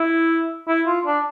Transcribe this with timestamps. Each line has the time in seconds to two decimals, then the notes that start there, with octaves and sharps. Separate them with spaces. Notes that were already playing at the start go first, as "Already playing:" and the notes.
Already playing: E4
0.68 E4
0.86 F4
1.06 D4